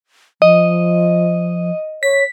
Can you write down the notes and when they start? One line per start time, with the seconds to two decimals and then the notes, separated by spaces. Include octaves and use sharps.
0.42 F3 D#5
2.03 C#5 B6